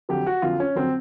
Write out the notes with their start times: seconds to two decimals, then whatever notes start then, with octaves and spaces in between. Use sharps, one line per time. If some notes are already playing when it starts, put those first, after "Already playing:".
0.09 F2 D3 F#3 G4
0.26 F#4
0.42 F2 D3 F#3 F4
0.60 C#4
0.75 F2 D3 F#3 C4